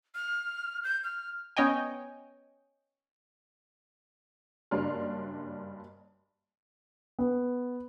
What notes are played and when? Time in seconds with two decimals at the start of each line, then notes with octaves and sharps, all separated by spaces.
0.15 F6
0.84 G6
1.04 F6
1.57 B3 C#4 C#5 D#5 G5 G#5
4.71 F#1 G2 D4 C#5 C6 F6
7.19 B3